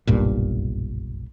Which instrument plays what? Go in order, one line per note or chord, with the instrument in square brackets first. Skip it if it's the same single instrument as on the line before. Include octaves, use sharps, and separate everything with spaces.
[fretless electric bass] F#1 B1 G2 A#2